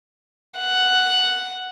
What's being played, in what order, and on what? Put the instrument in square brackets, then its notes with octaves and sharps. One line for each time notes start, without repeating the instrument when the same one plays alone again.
[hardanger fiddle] F#5